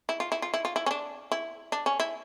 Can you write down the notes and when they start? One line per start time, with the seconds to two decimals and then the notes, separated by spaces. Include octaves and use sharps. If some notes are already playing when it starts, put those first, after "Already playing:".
0.09 E4
0.20 F4
0.32 E4
0.42 F4
0.54 E4
0.65 F4
0.76 E4
0.86 C#4
0.91 D4
1.32 E4
1.72 D4
1.86 C#4
2.00 E4